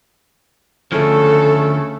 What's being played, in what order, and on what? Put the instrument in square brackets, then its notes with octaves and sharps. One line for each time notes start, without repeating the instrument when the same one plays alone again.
[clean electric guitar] D2 F3 [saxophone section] C#3 A3 [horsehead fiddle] A4